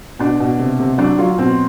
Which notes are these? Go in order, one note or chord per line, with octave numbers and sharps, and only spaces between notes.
B2 D4
B2
C3
C3
F#3 D4
F#3 F4
B2 C4